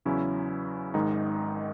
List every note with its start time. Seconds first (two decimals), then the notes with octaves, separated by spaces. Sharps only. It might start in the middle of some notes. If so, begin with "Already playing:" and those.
0.05 E2 C#3 F#3 C#4 E4
0.94 G#1 G#2 D#3 G#3 D#4